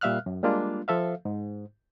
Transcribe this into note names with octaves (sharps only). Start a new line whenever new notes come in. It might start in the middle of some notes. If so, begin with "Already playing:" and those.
A#2 G3 E5 F5 F6 F#6
F#2
G3 G#3 A#3 D4 F4
F3 A4 E5 F5
G#2